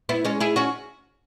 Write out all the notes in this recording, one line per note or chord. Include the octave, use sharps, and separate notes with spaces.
B3 E4
G#3 C#4
E4 G#4
C#4 F#4